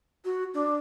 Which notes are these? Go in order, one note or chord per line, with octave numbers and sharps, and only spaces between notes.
F#4
D4